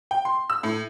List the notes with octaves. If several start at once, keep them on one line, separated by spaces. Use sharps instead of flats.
G5
C6
E6
A2